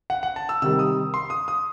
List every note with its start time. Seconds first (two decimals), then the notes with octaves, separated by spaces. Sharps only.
0.10 F#5
0.23 F#5
0.36 A5
0.49 E6
0.62 C3 D#3 G3 E6
0.79 D#6
1.14 C6
1.30 D#6
1.48 D#6